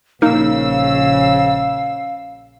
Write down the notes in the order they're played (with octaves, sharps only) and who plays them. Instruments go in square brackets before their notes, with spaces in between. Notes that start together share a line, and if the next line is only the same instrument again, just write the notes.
[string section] A#1 C#3 E6 [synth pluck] A#3 D#4 A#4 [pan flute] F5